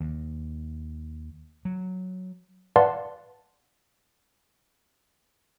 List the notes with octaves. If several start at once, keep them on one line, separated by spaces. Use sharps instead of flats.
D#2
F#3
B4 D5 F5 F#5 A5 C6